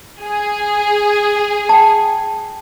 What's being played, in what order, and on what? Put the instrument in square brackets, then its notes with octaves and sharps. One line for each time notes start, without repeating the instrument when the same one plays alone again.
[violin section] G#4
[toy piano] G5 A5